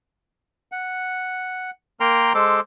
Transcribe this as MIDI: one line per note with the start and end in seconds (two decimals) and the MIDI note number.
0.72 1.71 78
2.00 2.33 58
2.00 2.33 70
2.00 2.33 79
2.00 2.33 82
2.00 2.33 84
2.35 2.60 56
2.35 2.60 69
2.35 2.60 72
2.35 2.60 86